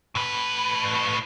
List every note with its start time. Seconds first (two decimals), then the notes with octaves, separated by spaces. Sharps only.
0.15 A2 B4